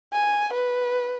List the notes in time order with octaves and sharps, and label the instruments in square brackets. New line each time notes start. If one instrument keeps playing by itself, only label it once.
[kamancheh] G#5
B4